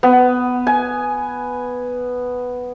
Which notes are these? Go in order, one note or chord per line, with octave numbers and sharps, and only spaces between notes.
B3
G#5